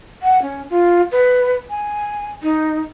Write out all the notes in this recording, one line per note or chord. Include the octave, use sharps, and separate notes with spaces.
F#5
C#4
F4
B4
G#5
D#4